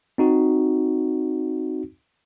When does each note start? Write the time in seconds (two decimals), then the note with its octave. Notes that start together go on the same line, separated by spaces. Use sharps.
0.18 C4 D#4 F#4